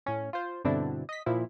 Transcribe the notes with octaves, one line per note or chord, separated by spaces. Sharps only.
A2 C#4
F4 C5
G2 B2 D3 C4 D4 E4
D#5 B6
A#2 F3 E4